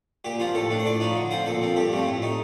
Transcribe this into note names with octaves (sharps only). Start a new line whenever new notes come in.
A#2 G4
F3 C4 F4
A2 A4
A3 D4
C5
A2 D5
F3 A3 D#4
D3
F3 C4 C5
A#2 A4
F3 C4
G2 G4
F3 A3 C4
A2
A3 D#4